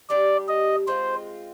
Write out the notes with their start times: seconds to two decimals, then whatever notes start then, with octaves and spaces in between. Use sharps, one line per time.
0.10 G3 D4 G4 D5
0.48 D#5
0.87 G#3 C4 F4 C5